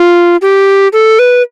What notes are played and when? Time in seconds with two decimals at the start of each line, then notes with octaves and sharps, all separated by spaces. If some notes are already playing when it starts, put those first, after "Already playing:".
Already playing: F4
0.42 G4
0.93 A4
1.19 B4